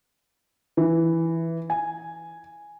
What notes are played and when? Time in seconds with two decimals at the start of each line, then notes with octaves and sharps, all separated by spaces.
0.77 E3
1.70 G#5